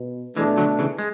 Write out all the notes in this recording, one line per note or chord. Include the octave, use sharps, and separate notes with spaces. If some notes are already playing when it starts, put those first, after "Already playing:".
Already playing: B2
B2 E3 G#3 A3 D4
D3 F#3
C#3 E3
G#3